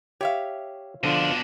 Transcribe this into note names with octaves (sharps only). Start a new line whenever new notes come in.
G4 C#5 E5 F5
B2 D3 F3 D4 F4